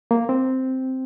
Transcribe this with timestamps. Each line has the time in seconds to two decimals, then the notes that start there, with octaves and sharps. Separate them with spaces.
0.11 A#3
0.29 C4